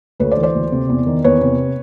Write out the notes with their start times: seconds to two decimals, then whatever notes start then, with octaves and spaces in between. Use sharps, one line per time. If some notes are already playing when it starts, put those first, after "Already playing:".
0.20 D2 B4 C#5
0.32 C5 D5
0.37 E3
0.43 C5 D5
0.55 D2
0.72 C3
0.89 E2
1.07 D#3
1.24 E2 B4 C#5
1.41 C3